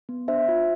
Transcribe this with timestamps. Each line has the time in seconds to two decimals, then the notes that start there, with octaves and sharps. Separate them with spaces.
0.09 B3
0.28 D4 C5 E5
0.48 F4